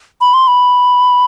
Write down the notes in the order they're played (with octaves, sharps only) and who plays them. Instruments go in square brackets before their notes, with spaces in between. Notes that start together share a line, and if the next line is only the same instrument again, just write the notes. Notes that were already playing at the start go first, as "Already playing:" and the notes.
[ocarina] B5
C6
B5